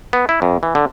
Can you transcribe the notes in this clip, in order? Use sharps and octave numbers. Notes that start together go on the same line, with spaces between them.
B3
E4
F2
E3
D3